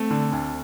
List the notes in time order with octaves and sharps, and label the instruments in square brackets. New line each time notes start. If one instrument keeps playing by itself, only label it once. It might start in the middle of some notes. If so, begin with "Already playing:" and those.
Already playing: [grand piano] A3 [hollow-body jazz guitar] C4
[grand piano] D3
D2